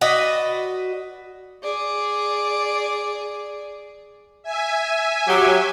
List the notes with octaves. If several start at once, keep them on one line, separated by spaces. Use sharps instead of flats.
F#4 B4 D5 D#5
G#4 D5
E5 G#5
F#3 G4